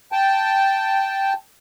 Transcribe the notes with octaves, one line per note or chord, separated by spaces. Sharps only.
G5 A5